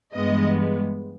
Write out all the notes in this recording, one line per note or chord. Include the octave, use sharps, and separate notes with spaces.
G2 E3 G#3 B3 D#5